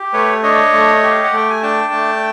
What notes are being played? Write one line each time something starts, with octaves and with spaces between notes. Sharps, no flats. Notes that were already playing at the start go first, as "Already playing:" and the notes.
Already playing: G4
A3 B4 C#5
D4 C#5 D#5
A3
G4
F5
F#5
A3 G5
G#5
D4 G5 A5
A3